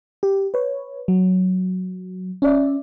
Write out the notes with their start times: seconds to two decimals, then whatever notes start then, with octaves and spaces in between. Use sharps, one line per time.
0.23 G4
0.54 B4 C#5
1.08 F#3
2.42 C#4 D5 E5